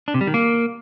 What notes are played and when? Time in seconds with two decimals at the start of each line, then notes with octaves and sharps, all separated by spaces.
0.08 D4
0.14 C3
0.21 G3
0.27 D#3
0.34 A#3